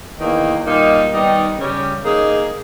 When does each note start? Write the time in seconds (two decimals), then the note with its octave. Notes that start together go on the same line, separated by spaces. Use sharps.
0.19 E2 D#3 A#3
0.65 A#2 G3 A#3 D#4
1.11 D#3 G3 B3 D#4
1.57 C#3 G3 C#4 G4
2.04 A#3 D#4 G#4